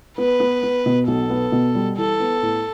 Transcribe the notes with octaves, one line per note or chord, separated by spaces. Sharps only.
B3 B4
B3
B3
B2
B1 A4
B3
B2
G3
E3 A4
B3
A2